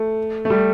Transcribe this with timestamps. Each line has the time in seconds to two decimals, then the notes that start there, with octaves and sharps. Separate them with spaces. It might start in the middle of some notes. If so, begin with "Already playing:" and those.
Already playing: A3
0.45 A3
0.50 G3